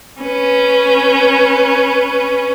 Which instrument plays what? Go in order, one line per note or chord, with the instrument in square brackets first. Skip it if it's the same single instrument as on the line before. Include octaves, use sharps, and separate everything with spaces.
[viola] C#4 B4